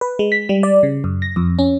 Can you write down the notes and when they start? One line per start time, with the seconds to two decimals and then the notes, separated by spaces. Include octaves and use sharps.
0.01 B4
0.19 G#3
0.32 B6
0.49 G3
0.63 D5
0.83 C#3
1.04 F#2
1.22 A#6
1.36 F2
1.59 C#4